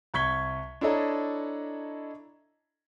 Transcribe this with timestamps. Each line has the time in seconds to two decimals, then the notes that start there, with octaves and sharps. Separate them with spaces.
0.14 C2 C#6 G#6 B6 G7
0.81 D4 E4 A4 C#5 D#5 A#5